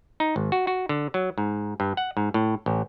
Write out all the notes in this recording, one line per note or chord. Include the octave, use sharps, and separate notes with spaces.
D#4
G#1
F#4
F#4
D3
F#3
G#2
G2
F#5
G#2
A2
A1